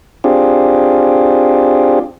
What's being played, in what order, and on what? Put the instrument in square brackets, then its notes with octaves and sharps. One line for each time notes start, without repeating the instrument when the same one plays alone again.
[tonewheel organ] C4 D4 F4 G4 G#4